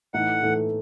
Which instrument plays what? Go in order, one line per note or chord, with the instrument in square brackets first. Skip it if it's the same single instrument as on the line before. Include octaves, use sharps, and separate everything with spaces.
[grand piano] A2 E3 A3 D#4 [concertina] F#5
[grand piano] A2 E3 A3 D#4